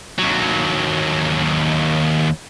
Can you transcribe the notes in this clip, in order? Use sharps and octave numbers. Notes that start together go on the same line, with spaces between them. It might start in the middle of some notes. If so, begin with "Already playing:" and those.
D#2 F#3